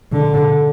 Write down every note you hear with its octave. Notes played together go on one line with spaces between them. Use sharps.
D3